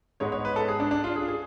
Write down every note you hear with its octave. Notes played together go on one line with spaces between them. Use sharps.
G#2 G#3 B3 C#5
C#5
B4
A4
G#4
D4
D4
F4
G#4
G#4